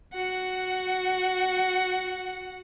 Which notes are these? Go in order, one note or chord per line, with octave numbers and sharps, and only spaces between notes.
F#4 F#5